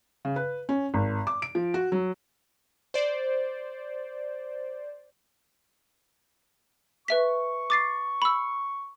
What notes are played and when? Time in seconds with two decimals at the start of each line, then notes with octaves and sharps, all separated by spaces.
0.25 C#3
0.36 B4
0.69 C#4
0.94 G#1
1.27 D6
1.42 D7
1.55 F3
1.74 F#4
1.92 F#3
2.94 C5 D5
7.08 B4 E5 C#6 B6
7.70 D6 A6 C7
8.22 B5 E6